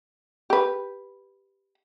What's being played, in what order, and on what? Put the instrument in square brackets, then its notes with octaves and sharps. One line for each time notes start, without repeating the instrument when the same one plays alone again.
[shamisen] G4 B4